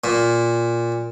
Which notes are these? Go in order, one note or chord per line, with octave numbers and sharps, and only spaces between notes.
A#2